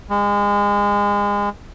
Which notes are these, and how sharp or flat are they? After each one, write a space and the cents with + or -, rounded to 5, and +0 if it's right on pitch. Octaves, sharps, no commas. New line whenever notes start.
G#3 -30